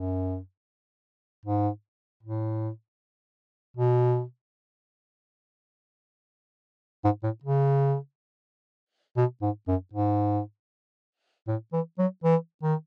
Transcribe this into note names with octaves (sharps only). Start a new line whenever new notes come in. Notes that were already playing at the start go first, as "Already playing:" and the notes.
Already playing: F#2
G#2
A2
B2
G#2
A2
C#3
B2
G#2
F#2
G#2
A2
E3
F#3
E3
D#3